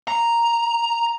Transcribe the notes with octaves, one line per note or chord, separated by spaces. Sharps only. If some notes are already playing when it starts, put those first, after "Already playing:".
A#5